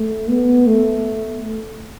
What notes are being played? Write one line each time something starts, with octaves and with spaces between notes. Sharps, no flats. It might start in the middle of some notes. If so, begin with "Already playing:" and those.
Already playing: A3
B3
A3